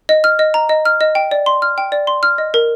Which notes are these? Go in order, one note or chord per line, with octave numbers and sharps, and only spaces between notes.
D#5
F6
D#5
A#5
D#5
F6
D#5
G5
D5
C6
F6
G5
D5
C6
F6
D#5
A#4